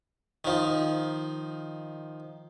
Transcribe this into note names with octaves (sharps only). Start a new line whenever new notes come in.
D#3 F3